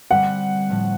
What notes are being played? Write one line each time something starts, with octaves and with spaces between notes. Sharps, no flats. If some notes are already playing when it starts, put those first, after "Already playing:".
D3 G3 C4 F#5
A2 F3 A3